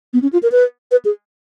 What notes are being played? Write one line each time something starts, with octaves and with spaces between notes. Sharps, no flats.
B3
C#4
F4
A#4
B4
B4
G#4